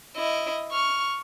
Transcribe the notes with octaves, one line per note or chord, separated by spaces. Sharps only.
E4 D#5
C#6 F6